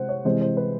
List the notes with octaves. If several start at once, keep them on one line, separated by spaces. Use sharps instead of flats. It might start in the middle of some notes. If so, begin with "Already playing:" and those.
Already playing: C3 G#3 C5 F#5
C#5
C3 E3 G#3 C5
C5
B4